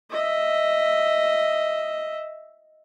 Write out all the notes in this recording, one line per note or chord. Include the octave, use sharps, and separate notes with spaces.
D#5 E5